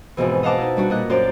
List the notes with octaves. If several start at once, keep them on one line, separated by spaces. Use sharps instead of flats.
F2 G#2 B2 E3
D#5 F5 F#5 A5 D6
D#4 E4
G3 D4 F#4
A#2 D#5 F#6
F#2 F4 C5 D5